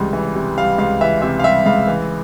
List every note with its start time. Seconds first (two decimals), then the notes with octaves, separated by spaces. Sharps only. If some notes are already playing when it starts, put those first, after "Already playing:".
Already playing: C#2 C3 E3 G3
0.13 E3
0.35 C3
0.57 G3 F5
0.78 C#2 F5
1.01 E3 E5
1.22 C3 E5
1.39 F5
1.44 G3 E5
1.66 C#2 F5
1.88 E3